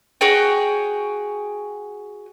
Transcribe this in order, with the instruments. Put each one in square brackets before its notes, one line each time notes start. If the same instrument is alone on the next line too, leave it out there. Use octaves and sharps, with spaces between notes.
[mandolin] F#4 G#4 C#5 G5